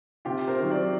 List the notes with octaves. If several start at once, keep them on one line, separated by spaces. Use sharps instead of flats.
C3 F4 G4
A#4 C5
D#3 F#3
C5 D5